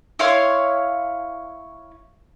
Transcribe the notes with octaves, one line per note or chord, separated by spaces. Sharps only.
E4 C#5 F5 C6